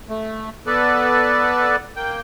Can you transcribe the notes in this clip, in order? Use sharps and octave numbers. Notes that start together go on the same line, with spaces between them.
A3
B3 A4 B4 D5
A#3 G5